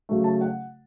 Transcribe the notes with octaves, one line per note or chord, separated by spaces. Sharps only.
C#3 F#3 A3
A5
F#5